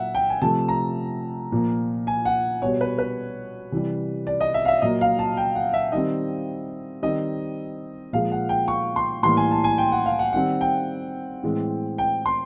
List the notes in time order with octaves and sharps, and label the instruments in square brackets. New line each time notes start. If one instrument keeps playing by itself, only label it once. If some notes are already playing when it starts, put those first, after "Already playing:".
Already playing: [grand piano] A#2 F#3 A#3 E5 F#5
G5
G#5
C3 F3 A3 A5
A#5
A#2 F3 A#3
G#5
F#5
B2 G3 B3 C#5
B4
B4
C3 E3 G3
D5
D#5
E5
F5
E5
A#2 F#3 A#3 D#5
F5
A5
G5
F#5
E5
D#3 G3 C4 D#5
D#3 G3 C4 D#5
A#2 F3 G#3 F5
F#5
G5
C#6
C6
A2 E3 G3 A#3 C6
G#5
A5
G#5
G5
F#5
F5
F#5
D#3 G3 C4 F#5
G5
A2 E3 G#3 C4
G5
C6